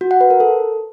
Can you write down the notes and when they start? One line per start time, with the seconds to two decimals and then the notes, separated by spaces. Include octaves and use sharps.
0.01 F#4
0.11 F#5
0.21 B4
0.30 A#4
0.40 A4